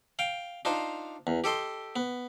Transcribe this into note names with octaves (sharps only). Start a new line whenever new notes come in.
F5 G5
D4 D#4 F4 C5
E2
G4 A4 D#5 C6
B3